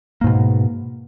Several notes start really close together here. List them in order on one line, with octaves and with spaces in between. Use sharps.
A#3 G#2 B2